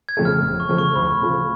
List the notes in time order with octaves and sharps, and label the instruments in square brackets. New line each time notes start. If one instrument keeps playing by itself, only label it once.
[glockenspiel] G#6
[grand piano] F2 C#3 F3 A3
[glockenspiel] F6
[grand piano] F1
[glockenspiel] C#6
[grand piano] F2 C#3 F3 A3
[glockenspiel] C#6
[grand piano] D2 [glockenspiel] B5
[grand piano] C#3 F3 A3 F4